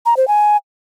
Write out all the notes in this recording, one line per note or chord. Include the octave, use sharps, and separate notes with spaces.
A#5
C5
G#5